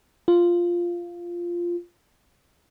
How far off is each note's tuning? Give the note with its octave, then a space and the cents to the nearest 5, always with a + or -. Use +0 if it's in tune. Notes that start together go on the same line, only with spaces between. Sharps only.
F4 -5